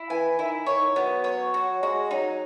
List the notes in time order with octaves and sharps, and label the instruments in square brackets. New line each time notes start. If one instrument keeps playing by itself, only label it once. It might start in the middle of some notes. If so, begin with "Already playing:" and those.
Already playing: [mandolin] E4
[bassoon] E3 [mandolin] G#5
[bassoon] D#3 [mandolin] E4
[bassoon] D#3 [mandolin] C#5
[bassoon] F#3 [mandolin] B3
[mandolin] C#5
F#4
[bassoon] G#3 [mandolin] F#4
[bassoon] F#3 [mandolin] D#4